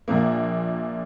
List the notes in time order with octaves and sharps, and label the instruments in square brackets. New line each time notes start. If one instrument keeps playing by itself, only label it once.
[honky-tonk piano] A#1 A#2 A#3